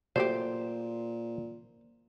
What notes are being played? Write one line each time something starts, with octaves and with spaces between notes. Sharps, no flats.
A#2 F#3 A3 G4 C5